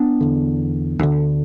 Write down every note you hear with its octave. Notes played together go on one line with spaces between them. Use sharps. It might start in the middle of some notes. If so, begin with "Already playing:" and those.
Already playing: B3 D4
E2 D3
D2 D3